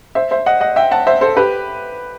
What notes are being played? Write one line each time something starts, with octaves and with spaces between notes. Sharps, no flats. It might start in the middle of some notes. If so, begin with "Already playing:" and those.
C5 E5
C5 E5
D#5 F#5
D#5 F#5
E5 G5
F#5 A5
C5 E5
A4 C5
G4 B4